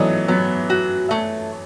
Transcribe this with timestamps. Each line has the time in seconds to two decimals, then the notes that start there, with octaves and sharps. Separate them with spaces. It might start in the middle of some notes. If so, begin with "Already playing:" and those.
Already playing: E3 F#3 A3 B3 D#5
0.28 F#3 B3
0.70 F#4
1.11 A3